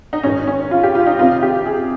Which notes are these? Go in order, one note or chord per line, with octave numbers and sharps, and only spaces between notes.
D#4
G#2 D#3 C#4
C#4
F4
G4
F4
D#4
F2 C3 D#3 F4
G4
G#4